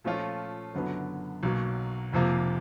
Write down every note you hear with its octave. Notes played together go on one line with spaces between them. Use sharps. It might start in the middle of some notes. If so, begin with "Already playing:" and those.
A#2 F3 A3 C#4 F4
F#1 F#2 D3 F#3 B3
B1 B2 F#3 A#3
F1 F2 C3 F3 A#3